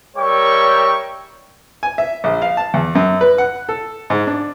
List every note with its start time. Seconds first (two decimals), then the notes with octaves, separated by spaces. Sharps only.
0.17 G3 A#4 C#5 E5 G5 C#6
1.83 G#5
1.98 E5
2.24 A#1
2.42 F5
2.57 A5
2.74 E2
2.95 F#2
3.21 B4
3.38 F#5
3.69 A4
4.10 G#2
4.27 D4